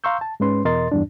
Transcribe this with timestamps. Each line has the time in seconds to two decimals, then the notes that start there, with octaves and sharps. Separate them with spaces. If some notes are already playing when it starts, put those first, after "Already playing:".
0.04 F5 A#5 C6 C#6 E6 G6
0.21 A5
0.40 G#2 G#3 C#4 B4 C6
0.65 E2 B2 A#4 D#5 C6 A6
0.92 E2 G2 D4